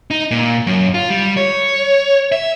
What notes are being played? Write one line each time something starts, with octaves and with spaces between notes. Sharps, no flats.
D#4
A#2
F#2
F4
G3
C#5
E5